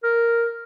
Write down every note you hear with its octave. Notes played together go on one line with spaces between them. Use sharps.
A#4